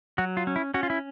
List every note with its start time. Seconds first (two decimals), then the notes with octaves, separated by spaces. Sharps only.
0.18 F#3 F#4
0.37 F4
0.47 C#4
0.56 E4
0.74 C#4 F#4
0.83 F4
0.90 E4